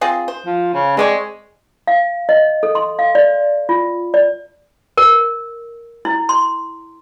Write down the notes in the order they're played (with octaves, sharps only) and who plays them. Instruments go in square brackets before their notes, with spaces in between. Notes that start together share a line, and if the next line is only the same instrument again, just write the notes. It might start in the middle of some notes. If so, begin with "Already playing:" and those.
[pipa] C4 F4 G#4
C5
[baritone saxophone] F3
C#3
[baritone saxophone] G#3 [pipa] C4 D5 C#6
[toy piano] F5
D#5
A4
C6
F5
D5
F4
D5
A#4
E4
C6